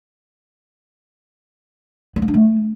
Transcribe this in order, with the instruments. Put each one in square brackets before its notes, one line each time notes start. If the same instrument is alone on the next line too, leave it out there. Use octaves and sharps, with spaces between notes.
[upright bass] B3
A#3
D4
A3